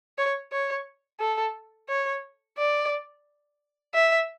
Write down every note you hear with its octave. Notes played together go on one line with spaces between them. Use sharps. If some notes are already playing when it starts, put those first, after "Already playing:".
C#5
C#5
A4
C#5
D5
E5